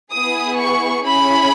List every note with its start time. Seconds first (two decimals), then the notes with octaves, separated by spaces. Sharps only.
0.13 B3 E4 G#4 D#6
0.59 C#6
1.05 C#4 E4 G#4 B5